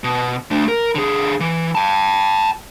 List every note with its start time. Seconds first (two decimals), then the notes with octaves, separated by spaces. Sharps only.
0.04 B2
0.51 A3 D4
0.68 A#4
0.95 D3 G#4
1.40 E3
1.75 G5 A5